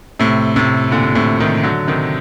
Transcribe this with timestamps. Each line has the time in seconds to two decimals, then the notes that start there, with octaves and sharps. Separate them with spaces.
0.20 A2 C3
0.56 A2 C3
0.91 A#2 D3
1.04 A#2
1.15 A2 C3
1.40 C3 D#3
1.64 D3 F#3
1.88 C3 D#3